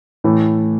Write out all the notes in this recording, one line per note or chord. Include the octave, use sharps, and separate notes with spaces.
A2 E3 A3